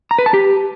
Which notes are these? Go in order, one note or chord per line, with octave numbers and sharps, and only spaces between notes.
A#5
B4
A5
G4